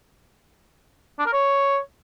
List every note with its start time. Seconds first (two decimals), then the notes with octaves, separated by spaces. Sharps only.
1.20 D4
1.26 A#4
1.33 C#5